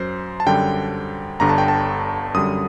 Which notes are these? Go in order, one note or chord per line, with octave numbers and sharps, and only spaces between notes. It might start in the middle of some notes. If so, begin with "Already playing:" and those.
Already playing: F#2 F#3 C5
A5
F#2 D3 G3 G5
G1 G2 D3 A#5
A5
G5
A5
F#2 D3 G3 D#6